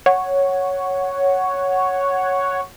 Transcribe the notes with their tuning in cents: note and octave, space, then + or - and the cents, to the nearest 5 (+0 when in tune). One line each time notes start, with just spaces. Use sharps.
C#5 +0 F#5 +0